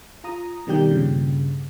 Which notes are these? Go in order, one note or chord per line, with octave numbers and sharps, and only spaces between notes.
F4 A#5 D#6
B2 D#3 G3 G4 G6
G2 A#2 C#3